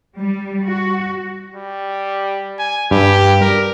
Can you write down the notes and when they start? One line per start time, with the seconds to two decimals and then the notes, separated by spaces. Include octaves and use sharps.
0.18 G3
0.65 F#4
1.54 G3
2.59 G#5
2.91 G2 G4
3.41 A#4